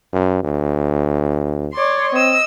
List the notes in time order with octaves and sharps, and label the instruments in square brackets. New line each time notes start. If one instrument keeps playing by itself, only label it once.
[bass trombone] F#2
D2
[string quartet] C#5 D5 C6
[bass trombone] C4 [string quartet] D#5 E6